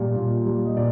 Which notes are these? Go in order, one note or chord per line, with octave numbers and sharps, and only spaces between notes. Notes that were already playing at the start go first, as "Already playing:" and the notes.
Already playing: A#2 G3
A#2
G3
D#5
A#2 D5